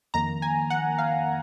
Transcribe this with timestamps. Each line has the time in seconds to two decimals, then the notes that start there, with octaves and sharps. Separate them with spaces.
0.14 F2 D#3 A#3 A#5
0.42 G#5
0.70 F#5
0.98 F5